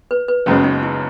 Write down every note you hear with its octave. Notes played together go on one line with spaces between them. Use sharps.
B4
B4
F#1 F#2 C#3 G#3 B3 C#4
D#4
E4